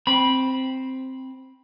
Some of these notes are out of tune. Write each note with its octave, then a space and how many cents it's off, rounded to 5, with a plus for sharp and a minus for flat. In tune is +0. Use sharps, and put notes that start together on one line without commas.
C4 +0 B5 -15